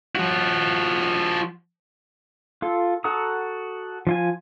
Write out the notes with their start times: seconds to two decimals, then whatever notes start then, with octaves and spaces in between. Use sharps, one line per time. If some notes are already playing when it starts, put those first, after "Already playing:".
0.15 F3 F#4
2.62 F4 A4
3.04 F#4 A4 F#5 A#5 D#6
4.07 F3 F4 G#5